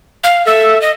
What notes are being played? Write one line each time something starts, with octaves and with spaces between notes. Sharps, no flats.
F5
A4 E5
D#5